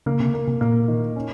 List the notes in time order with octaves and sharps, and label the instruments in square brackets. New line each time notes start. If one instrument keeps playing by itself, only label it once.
[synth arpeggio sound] C#3 [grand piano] A#3
[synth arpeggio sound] C3
[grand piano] A#3
[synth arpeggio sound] C3
[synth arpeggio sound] A#2 [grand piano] A#3
[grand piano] D#3
C#4